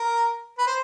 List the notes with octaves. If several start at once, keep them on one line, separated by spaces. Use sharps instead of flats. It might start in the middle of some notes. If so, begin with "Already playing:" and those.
Already playing: A#4
B4
C5